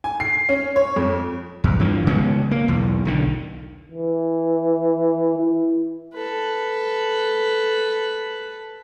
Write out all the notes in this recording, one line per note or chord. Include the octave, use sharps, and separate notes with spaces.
G#5
C7
C#4
C#5
F2
E2
G2 E3 F3
C#3 G#3 B3 C#4
A#3
B1 E2
B1 D3 D#3
E3
E4
A4 B4